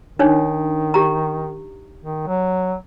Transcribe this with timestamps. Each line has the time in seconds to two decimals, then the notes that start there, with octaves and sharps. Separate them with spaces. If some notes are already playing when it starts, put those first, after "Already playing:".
0.19 D#3 D4 D#4 C#5
0.94 G4 A#5
2.03 D#3
2.27 F#3